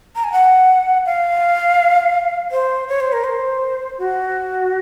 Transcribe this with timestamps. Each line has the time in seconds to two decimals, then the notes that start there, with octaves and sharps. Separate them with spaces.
0.15 A#5
0.24 G#5
0.32 F#5
1.06 F5
2.51 C5
2.89 C#5
3.00 C5
3.13 A#4
3.24 C5
3.99 F#4